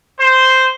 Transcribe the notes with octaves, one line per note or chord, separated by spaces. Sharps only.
C5